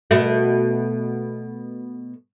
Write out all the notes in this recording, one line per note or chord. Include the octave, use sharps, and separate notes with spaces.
B2 A3